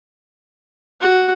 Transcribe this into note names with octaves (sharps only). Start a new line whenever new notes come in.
F#4